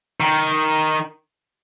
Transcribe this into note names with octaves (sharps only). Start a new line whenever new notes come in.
D#3